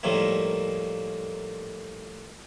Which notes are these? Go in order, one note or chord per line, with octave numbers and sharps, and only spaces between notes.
A2 D#3 F3 G3 A3 A#3